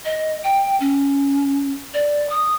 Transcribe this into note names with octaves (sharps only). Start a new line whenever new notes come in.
D#5
G5
C#4
D5
D#6